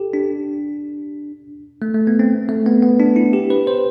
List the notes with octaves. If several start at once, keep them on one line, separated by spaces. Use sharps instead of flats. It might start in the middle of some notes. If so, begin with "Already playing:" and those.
Already playing: G4 A4
D4
A3
A3
B3
C4
A3
B3
B3
D4
E4
G4
B4
C5